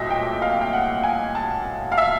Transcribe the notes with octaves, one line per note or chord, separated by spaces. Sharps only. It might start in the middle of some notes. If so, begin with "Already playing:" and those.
Already playing: C2 A#2 F#3 A3 D#5 E5
G5
F5
G5
F#5
G#5
A5
F5
E5